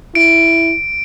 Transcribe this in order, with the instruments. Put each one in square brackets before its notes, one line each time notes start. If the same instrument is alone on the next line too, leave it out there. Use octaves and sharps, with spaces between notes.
[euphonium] E4 [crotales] D7